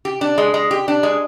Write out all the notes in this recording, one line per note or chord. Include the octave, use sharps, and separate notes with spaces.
G4
D4
G#3
G#3
G4
D4
G#3